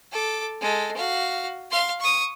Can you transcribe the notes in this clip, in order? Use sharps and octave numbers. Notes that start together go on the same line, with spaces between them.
A4 D6
G#3 A4
F#4 F5
F5 C6
C#6 D#6